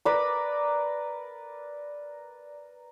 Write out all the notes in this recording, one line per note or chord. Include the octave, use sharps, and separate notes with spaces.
A#4 B4 D5 B5